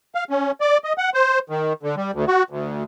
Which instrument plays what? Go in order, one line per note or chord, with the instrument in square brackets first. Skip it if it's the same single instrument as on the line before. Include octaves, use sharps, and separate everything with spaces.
[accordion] F5
C#4
D5
D#5
F#5
C5
D#3
D3
G3
D2
F#4
D2